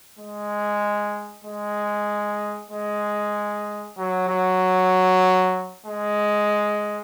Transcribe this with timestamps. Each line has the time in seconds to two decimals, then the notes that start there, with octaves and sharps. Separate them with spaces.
0.19 G#3
1.44 G#3
2.71 G#3
3.97 F#3
4.28 F#3
5.86 G#3